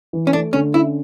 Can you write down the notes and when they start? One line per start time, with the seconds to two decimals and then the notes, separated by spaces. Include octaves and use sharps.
0.13 E3
0.27 C#4
0.33 A3 D4
0.53 D3 C#4
0.73 C#4 E4